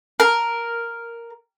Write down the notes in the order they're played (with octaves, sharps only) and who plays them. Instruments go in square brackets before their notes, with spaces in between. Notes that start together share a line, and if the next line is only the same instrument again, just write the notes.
[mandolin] A#4